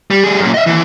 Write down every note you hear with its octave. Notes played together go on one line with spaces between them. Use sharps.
G3
G3 G#4
F#2 A#2
D#5 E5
D#2 E3